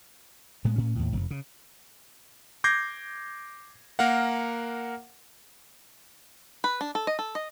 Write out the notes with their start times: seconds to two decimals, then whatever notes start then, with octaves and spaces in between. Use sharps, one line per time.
0.65 A2 G#3 B3
0.76 A2 C#4
0.95 D#2 A2
1.13 F1
1.31 C#3
2.64 D6 G6 G#6 A#6 C7
3.99 A#3 A#4 F5 F#5
6.64 B4
6.81 D4
6.95 A4
7.07 D#5
7.19 A4
7.35 D#5